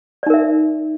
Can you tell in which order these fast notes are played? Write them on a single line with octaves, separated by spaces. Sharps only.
D5 D#4 A#4 E5